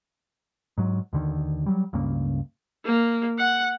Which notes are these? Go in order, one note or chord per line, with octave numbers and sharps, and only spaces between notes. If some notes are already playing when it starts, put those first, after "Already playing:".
G#2 F#3
D#2 D3 D#3
F#3 G3
C#2 G2 C#3 A#3
A#3
F#5